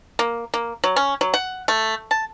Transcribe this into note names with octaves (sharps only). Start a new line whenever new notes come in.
A#3
A#3
F#3
C#4
F#3
F#5
A3
A5